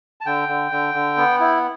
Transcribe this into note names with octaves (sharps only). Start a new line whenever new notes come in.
A5
D3 G5
D3
D3
D3
B3
E4